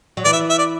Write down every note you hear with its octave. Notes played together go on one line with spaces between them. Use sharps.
F#3
E3 D5
E5
E5
D5